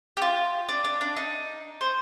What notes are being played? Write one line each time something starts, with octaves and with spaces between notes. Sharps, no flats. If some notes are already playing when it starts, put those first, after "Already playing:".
G4
F4
D4
D4
D4
D#4
C5